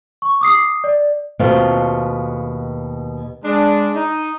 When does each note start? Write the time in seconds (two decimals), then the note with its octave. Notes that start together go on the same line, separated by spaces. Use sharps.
0.22 C#6
0.41 D6 D#6 C7
0.84 D5
1.39 D#2 B2 A3 C4 F4
3.45 G#3 D4
3.94 D#4